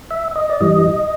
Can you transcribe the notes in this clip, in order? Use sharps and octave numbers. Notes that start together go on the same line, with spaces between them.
E5
D#5
D5
G2 E3 G3 D#5